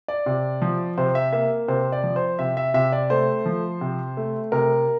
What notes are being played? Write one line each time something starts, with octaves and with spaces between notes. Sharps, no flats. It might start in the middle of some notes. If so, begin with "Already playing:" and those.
D5
C3
F3
C3 C5
E5
A#3 E5
C3 C5
D5
F3
C5
C3 E5
E5
C3 E5
D5
A3 C5
F3
C3
A3
C3 A#4